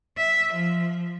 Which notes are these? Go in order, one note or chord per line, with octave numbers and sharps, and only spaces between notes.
E5
F3